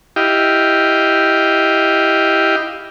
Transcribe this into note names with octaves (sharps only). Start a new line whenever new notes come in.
E4 G4 D#5 F5 G5